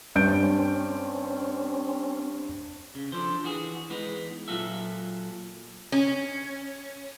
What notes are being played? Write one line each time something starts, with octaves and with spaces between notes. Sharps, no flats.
G2 C4 C#4 G6 D7
C#3
D3 F3 C5
E3 F#4 G#4
E3 G#3 B3 D#4
A#2 F#3 F4 F#4 A4 E5
C#4